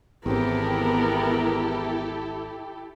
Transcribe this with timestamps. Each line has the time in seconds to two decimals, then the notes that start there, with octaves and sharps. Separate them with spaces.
0.26 G#1 E2 B3 C4 E4 G4 A4 A#4